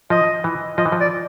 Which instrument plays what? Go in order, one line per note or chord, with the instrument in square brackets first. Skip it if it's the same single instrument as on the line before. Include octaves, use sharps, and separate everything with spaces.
[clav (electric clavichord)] F3 [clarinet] D#5
[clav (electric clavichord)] E3
[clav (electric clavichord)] F3 [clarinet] D#5
[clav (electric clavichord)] E3
F3
[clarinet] D5